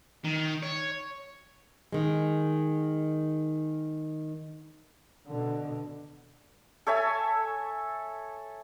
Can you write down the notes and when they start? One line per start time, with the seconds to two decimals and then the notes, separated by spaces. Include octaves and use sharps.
0.24 D#3
0.63 C#5
1.93 D#3 G#3
5.27 B2 D3
6.87 A4 C#5 E5 G#5